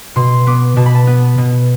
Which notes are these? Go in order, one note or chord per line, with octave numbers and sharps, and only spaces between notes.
B2 C6
B3 D6
B2 A5
B5
A5
B3
B2